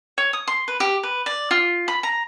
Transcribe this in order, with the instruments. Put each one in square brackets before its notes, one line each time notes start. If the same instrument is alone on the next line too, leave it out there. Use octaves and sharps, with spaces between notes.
[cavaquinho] C#5
D#6
C6
B4
G4
B4
D5
F4
B5
A#5